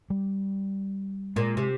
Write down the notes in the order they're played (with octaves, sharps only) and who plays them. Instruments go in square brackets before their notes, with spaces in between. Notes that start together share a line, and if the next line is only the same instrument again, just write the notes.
[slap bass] G3
[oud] A#2 [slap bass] G#3
[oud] C3